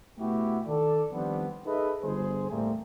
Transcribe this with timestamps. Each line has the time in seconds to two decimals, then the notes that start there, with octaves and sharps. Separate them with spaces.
0.18 B2 A3 B3 E4 F#4 G4
0.67 D#3 A4 D5
1.12 D#3 F3 G3 B3 C4 D4
1.66 D#4 G#4 A4 B4 D#5 E5
2.03 G1 G#4 C5
2.50 E2 A2 G3 A3 A#3 C4